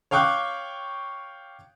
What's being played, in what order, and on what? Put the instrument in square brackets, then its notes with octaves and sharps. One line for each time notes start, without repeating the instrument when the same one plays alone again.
[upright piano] C#5 F5 G5 C#6 D6 F#6